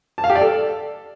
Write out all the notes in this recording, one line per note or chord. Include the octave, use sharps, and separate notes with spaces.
A5
F5
G4
D5
A4